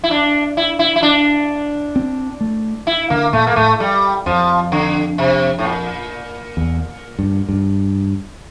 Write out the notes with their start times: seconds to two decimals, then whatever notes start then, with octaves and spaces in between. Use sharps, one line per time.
0.04 E4
0.11 D4
0.57 E4
0.79 E4
0.96 E4
1.03 D4
1.96 C4
2.41 A3
2.87 E4
3.10 D3 A#3
3.33 A#2 A3
3.47 A#3
3.56 A2 A3
3.80 G3
4.26 F2 F3
4.72 D3
5.18 C3
5.59 A2
5.65 A#2
6.57 E2
7.19 G2
7.49 G2